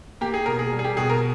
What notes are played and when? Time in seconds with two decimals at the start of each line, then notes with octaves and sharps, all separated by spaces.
0.21 A#3 G4
0.34 G#4
0.46 B2 A#4
0.59 G#4
0.72 G3
0.79 G#4
0.84 G4
0.97 B2 G#4
1.10 A#4